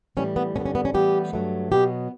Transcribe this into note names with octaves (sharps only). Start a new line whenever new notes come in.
A2 E3 G3 C#4
B3
G2 D3 G3 B3 C#4
C#4
B3
C#4
A2 E3 G3 B3 G4
G2 F#3 A3
B2 F#3 B3 G4